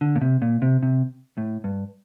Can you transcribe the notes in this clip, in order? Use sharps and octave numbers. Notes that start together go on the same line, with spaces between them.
D3
A#2
C3
A#2
C3
C3
A2
G2